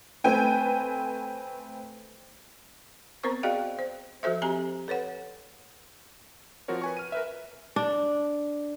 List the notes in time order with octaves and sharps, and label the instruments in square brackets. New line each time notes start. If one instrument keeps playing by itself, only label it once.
[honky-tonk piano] A3 C4 B4 G5 G#5
[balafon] B3 C4 A#4 C5 C#6
F#4 G#4 D5 D#5 F5 G5
C5
F3 F#4 A4 C5 E5
C4 G4 G#5 A#5
A4 B4 C#5 F#5
[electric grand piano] F3 C4 F4 F#4 A#4 C#5
B4 G#5 C#6
F6 D#7
A#4 B4 E5
[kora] D4